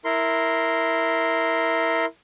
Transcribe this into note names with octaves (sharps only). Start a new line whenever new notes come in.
E4 A#4 C6